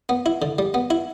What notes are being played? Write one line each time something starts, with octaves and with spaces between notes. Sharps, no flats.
B3
E4
D3
G3
B3
E4